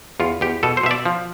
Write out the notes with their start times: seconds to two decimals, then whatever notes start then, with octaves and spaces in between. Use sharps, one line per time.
0.20 E2 F4
0.41 E2 G4
0.63 B2 A4
0.77 C5
0.83 B2 E5
0.91 D5
1.06 F3